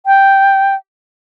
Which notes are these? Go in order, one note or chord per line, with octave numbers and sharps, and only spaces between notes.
G5